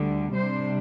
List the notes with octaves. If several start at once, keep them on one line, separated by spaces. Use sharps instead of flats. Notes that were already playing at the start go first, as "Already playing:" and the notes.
Already playing: D2 D3 G3
C3 G3 D4 C5